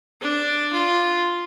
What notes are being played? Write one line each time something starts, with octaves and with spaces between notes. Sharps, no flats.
D4
F4